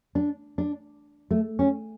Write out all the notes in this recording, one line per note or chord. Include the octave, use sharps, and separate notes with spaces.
D4
D4
A3
C#4